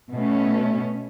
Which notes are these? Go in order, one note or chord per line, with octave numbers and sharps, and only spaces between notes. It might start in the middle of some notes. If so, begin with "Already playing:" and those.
B2 A3 C#4